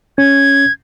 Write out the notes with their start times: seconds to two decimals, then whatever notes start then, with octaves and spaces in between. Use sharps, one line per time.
0.18 C#4 G#6